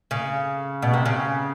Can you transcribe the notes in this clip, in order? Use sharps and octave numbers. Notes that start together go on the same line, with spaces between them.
C#3
B2
C3
C#3